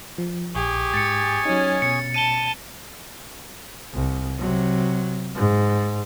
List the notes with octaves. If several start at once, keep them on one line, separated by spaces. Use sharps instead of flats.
F3
A#1 G4 G#4 G#5 C#6
G#2 A6 C#7
F#3 C#4 D#4
B2 C#7
A5 D#7 G7
C2
C3 F#3
G#2